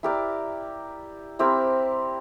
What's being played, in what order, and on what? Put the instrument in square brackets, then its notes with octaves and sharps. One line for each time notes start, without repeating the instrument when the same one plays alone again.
[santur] E4 G4 A#4 D5
C4 E4 G4 A#4